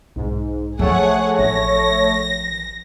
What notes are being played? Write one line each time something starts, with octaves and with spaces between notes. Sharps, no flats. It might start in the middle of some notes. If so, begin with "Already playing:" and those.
B1 G#2
F3 A3 G#4 C#5 F#5
A1 A#6